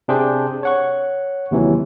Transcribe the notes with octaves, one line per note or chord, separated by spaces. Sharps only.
C3 D4 G4 G#4 C5
C#5 F#5 C#6
D#2 C3 E3 F#3